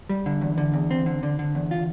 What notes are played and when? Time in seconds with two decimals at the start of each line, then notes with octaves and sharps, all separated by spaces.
0.09 G3
0.26 D3
0.41 E2
0.58 D3
0.74 E2
0.91 C4
1.06 D3
1.23 D3
1.39 D3
1.55 E2
1.71 F4